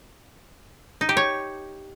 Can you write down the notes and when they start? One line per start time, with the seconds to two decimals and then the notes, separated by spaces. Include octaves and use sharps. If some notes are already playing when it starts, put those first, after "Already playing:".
1.01 D#4
1.09 G4
1.17 C#5